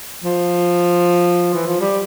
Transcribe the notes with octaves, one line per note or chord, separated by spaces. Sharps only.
F3
E3
F3
G3